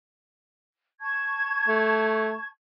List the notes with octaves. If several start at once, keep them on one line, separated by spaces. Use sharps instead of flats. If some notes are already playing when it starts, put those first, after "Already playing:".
A5 C#6 G#6
A3